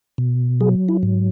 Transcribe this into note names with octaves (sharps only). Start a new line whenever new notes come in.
B2
F#3 G#4
E4
G#2